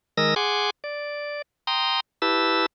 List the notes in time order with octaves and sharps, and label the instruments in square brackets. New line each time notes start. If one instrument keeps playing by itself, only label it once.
[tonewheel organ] D#3 G#3 A#4 D#6 E6 A#6
G#4 F#5 G#5 C6 D6
D5
G5 A#5 C6 D#6
E4 G4 B4 A5 E6